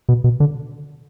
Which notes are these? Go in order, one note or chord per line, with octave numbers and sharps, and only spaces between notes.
B2
B2
D3